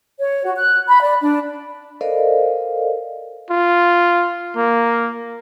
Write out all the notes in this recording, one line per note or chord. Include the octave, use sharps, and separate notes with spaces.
C#5
F#4
F#6
B5
D5
D4
A4 A#4 C5 D5 D#5 F5
F4
A#3